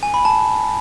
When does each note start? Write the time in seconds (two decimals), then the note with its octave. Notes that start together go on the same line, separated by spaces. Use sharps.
0.03 G#5
0.14 B5
0.25 A5